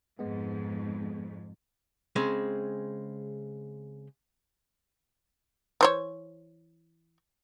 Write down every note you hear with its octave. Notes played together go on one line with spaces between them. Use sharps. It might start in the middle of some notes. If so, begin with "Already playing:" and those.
F2 G#2 G#3 B3
C#3 G#3 C4
E3 C5 C#5